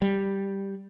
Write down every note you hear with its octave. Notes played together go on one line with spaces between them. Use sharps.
G3